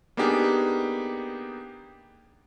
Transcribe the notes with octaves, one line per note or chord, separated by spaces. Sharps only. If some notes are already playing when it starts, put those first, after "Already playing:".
A#3 B3 D4 D#4 G4 G#4